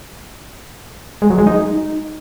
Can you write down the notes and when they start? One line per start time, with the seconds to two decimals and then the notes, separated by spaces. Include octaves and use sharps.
1.22 G#3
1.30 F#3
1.38 G#3
1.47 D#4